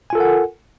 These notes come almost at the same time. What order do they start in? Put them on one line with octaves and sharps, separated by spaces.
G#5 F4 A4 A#4 F#5